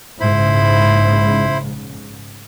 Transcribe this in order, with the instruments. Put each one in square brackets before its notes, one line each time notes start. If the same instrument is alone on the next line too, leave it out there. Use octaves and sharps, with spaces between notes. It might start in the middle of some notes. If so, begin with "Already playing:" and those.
[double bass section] A#1 G#2 C#3 [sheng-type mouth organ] E4 C5 B5